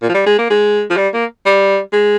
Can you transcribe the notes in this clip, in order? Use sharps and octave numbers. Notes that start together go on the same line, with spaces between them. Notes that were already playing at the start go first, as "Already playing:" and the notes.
A#2
F3
G3
G#3
A#3
G#3
F3
G3
A#3
G3
G#3